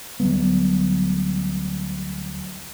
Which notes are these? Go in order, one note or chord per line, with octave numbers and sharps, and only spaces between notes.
D2 F#3 G3 B3